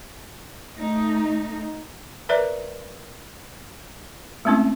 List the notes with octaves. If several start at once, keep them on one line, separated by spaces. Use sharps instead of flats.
A3 D#4
A#4 B4 D5 E5 A#5
G#3 A3 C4 C#4 E4